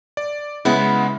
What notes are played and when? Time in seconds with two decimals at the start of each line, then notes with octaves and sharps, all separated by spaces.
0.17 D5
0.65 C#3 G#3 B3 E4